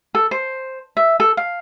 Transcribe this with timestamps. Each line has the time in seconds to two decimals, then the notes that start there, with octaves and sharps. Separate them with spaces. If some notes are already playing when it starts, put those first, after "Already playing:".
0.15 A4
0.31 C5
0.97 E5
1.20 A4
1.37 F5